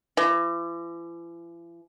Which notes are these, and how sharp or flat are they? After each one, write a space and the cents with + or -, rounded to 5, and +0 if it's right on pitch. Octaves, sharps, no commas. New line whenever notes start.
E3 +45